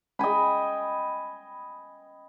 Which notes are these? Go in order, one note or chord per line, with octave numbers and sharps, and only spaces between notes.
D#5 G5 G#5 B5